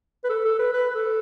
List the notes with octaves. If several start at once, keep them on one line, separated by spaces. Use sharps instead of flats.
B4
A4
A4
B4
B4
B4
A4